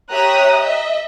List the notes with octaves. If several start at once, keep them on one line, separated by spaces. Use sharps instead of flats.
G4 C#5 E5 A#5 D#6 F#6
D#5 E5